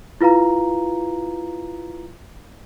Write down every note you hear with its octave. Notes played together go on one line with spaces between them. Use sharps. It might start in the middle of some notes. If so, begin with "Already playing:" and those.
E4 F4 B4 F5 A#5